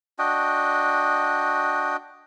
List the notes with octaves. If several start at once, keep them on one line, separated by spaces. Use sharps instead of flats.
D4 F#4 D#5 G5